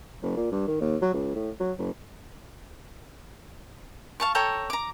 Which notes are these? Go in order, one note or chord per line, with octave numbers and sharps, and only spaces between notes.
F#1
A#2
G2
D#3
D#2
F#3
C#2
A2
F#3
F#1
F5 A5 C#6
A4 C#5 G5 A#5
A#5 D6